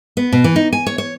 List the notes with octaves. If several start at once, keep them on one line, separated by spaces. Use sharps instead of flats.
B3
B2
E3
D#4
G#5
C#5
C#5